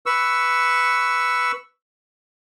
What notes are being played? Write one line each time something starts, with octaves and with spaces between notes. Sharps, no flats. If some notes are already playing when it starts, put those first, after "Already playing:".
B4 C#6 E6